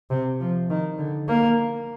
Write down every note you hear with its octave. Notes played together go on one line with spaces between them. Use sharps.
C3
F3
D#3
D3
A#3